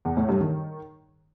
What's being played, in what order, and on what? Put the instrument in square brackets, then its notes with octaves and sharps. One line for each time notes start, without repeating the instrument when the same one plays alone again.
[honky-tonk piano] E2
A2
G2
D#3